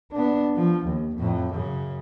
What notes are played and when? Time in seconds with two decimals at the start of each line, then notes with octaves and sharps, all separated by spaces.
0.12 B3 D4
0.56 F3
0.85 D#2
1.15 F2 A2
1.53 F#2 C#3